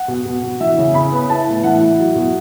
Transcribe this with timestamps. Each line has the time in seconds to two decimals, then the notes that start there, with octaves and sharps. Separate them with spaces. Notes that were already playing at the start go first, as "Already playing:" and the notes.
Already playing: F#5
0.08 B2
0.26 B2
0.43 B2
0.60 E3 E5
0.78 C#3
0.94 C#3 B5
1.12 B3
1.29 E4 A5
1.47 A2
1.63 E3 F#5
1.81 E4
1.98 F#3
2.16 B2